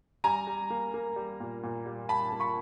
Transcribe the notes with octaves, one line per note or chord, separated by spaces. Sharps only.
G3 G#5 A#5
G3
A#3
A#3
G3
A#2
A#2
G3
G3 A5 B5
A#3
B5 C#6